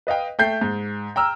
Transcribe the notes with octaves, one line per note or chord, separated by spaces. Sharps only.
B4 D#5 F5 G5
A3 G5 G6 C7
G#2
G5 A#5 E6 F6